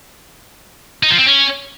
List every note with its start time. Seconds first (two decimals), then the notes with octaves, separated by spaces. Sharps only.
1.03 D#4
1.11 F3
1.18 C4
1.26 C#4